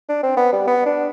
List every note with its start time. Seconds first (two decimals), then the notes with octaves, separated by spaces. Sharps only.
0.09 D4
0.23 C4
0.37 B3
0.52 G3
0.67 B3
0.86 D4